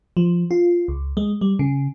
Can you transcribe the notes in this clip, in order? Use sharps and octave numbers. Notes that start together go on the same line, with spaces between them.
F3
F4
C#2
G#3
G3
C#3